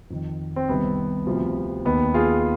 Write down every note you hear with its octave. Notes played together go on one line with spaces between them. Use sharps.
F2 D#3
C4
C2 C3 D#3 B3
D2 C3 F3
D#2 D#3 B3
F4 G#4